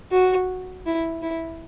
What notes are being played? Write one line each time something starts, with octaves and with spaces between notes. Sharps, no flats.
F#4
E4
E4